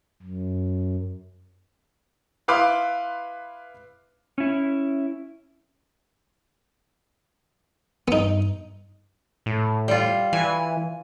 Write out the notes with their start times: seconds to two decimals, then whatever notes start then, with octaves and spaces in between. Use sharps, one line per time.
0.23 F#2
2.48 E4 B4 F5 B5 C6 D6
4.38 C#4 E4
8.08 G2 B3 D#4
9.46 A2
9.88 G3 F4
10.33 E3 G#5